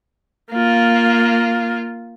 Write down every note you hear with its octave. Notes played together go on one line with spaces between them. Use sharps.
A#3 F4